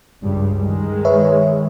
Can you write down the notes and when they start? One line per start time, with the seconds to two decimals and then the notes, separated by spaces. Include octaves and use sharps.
0.23 C#2 G2 G3
0.59 D#3 G#3
1.05 B4 C#5 E5